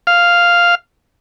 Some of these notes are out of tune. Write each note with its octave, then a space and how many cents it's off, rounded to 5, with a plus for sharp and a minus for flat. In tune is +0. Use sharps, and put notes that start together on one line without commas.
F5 +0